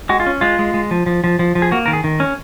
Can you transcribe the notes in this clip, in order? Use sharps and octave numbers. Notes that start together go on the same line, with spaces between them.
G#3 F#4
F4
C#4
G#3 F4
G#3
G#3
F3
F3
F3
F3
F3
G#4
A#3 F#4
D#3 A#4
G#4
D#3
C#4